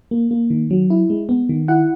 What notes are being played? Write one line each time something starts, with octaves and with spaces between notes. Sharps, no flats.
A#3
A#3
D#3
F#3
E4
G#3
B3
D#3
E4 F#5